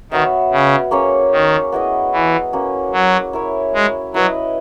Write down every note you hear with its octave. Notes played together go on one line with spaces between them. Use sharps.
D#3 B3 F#4 C#5 E5
C#3
A#3 C#4 G#4 C#5
D#3
B3 E4 G#4 D#5
E3
A#3 C#4 F#4
F#3
E4 A#4 C#5
G#3
F#3 E4 B4 D#5